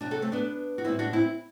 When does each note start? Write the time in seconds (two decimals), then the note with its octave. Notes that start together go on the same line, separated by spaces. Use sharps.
0.01 C3 F#3 D4 F#4
0.11 F#4 A4
0.22 A3 C4
0.32 B3 D4
0.78 F#4
0.84 A2 G3 C4 E4
0.99 D4 F#4
1.13 C4 E4